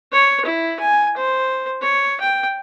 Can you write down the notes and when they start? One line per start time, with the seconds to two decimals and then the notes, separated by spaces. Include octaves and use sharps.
0.12 C#5
0.45 E4
0.80 G#5
1.17 C5
1.82 C#5
2.20 G5